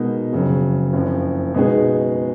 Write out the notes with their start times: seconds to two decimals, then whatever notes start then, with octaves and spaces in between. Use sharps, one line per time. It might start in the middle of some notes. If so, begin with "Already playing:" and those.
Already playing: B2 G#3 D#4 A#4
0.33 F#1 F2 C#3 F#3
0.93 F#1 F2 F3
1.54 B2 G#3 B3 D#4 G#4